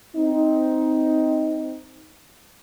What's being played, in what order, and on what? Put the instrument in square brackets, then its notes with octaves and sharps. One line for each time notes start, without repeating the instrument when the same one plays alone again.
[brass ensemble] C4 D#4